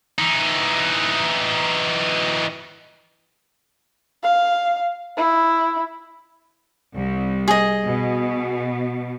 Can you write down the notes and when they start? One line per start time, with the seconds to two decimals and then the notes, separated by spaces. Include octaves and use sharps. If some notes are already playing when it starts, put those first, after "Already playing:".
0.18 E3 D#4
4.23 F5
5.17 E4
6.94 C2
7.48 G#4 D#5
7.86 B2